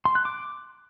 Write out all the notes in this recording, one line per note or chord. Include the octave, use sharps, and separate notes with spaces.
C6
F#6
D6